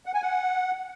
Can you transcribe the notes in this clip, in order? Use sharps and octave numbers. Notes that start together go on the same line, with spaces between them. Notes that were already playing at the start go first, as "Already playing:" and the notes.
F#5
G#5
F#5